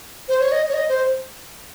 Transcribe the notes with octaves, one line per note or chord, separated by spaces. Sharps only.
C5
C#5
D#5
C#5
D#5
C5